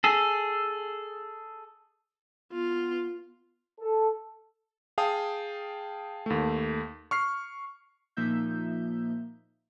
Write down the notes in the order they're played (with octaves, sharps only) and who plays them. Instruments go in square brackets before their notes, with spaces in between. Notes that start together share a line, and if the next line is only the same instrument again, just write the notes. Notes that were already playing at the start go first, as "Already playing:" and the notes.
[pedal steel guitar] G#4 A4
[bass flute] B3 [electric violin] F4
[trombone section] A4
[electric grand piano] G#4 F5 G5 A5 D#6
D#2 A3
C#6 F6 C7
[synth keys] A#2 F3 A#3 D#4 E5 G6